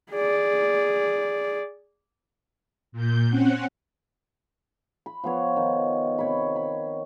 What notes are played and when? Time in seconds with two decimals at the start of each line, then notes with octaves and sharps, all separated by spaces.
0.12 G#4 D5
2.92 A#2 G6
3.29 C4 C#4 F#5
5.06 B5
5.24 F3 B3 C#5
5.56 D#3
6.18 C3 C#5 B5
6.56 B5